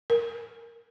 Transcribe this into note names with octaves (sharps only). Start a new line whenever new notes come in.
A#4